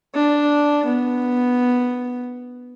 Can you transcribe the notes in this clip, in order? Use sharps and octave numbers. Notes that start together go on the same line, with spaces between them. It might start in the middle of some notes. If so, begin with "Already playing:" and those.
D4
B3